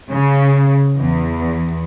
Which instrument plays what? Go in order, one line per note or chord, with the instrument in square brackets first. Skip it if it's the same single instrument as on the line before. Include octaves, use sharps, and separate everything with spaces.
[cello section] C#3
E2